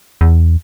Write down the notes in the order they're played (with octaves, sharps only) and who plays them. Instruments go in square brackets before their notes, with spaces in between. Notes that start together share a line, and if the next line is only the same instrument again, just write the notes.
[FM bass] E2